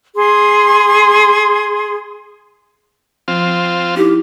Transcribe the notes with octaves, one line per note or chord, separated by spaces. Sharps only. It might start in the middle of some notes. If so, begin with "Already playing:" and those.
G#4 C6
F3 C4 F4
D#4 E4 G4